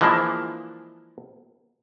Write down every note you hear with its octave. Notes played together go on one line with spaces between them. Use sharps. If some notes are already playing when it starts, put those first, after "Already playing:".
E3 F3 G#3 A#3 D4 E4